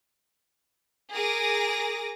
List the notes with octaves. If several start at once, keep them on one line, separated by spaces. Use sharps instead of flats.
G#4 A#4 D6 D#6 A#6